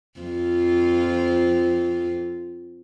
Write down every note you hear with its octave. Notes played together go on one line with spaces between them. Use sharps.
F2 F4